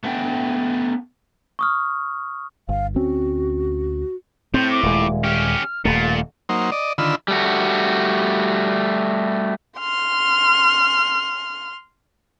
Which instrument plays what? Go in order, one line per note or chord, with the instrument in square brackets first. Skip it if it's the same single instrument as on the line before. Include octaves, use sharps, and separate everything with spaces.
[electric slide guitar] A3 B3 G5
[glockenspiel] C#6 D#6 F6
[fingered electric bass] G1 [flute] F5
[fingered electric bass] D2 C4 C#4 [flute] F#4
[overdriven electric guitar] A2 [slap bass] C4 [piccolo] G6
[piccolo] D6
[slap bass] D#1 G#3
[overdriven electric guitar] C#4 G4 [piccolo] F6
[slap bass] D#1 A3 [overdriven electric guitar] A#2 [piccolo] A6
[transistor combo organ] F#3 A#3 D#4 C5
D5 D#5
D3 D#3 F4 B5 E6
[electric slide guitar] G3 A3 F#4
[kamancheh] C6 F6